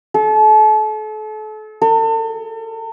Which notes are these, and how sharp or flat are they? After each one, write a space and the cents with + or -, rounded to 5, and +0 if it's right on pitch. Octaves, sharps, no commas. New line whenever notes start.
A4 -35
A4 +40